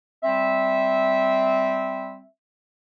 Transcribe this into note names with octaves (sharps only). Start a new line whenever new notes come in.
G3 C4 E5